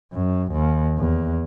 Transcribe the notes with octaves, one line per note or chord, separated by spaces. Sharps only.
F#2
D#2
E2